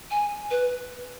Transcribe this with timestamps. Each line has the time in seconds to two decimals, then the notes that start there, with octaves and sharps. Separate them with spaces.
0.11 G#5
0.51 B4